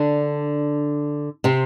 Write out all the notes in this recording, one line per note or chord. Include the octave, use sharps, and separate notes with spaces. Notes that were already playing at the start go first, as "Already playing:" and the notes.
Already playing: D3 D4
C3 C4